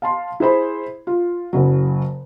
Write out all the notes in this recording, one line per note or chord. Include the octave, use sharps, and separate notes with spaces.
F5 A5 C6
E4 G#4 C5 B5
F4
F#1 C#3 F#3